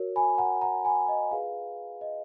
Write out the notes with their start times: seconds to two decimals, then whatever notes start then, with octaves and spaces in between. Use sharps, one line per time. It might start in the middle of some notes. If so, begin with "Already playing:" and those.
Already playing: F#4 A#4 C#5
0.16 G#5 B5
0.38 F#5 A#5
0.61 F#5 A#5
0.85 G#5 B5
1.08 D#5
1.31 F4 G#4 B4 F5
2.01 D#5